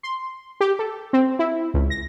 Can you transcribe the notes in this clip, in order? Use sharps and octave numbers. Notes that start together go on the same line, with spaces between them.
C6
G4
A4
C4
E4
C#2
A#6